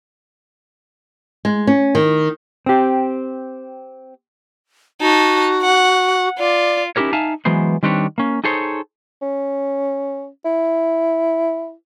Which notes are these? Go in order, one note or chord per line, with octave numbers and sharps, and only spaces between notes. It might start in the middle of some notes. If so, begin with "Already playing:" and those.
G#3
C#4
D#3
C4 G4
D#4 F#4 A5
F#5
F4 D5
C#4 D#4 E4 G4 A#4 C#5
D#4 E5 F5 G#5 A5
E3 F#3 G#3 B3 C5
D#3 G3 C4 D4 B4 C#5
A#3 C#4
D#4 G#4 A4 C5 C#5
C#4
E4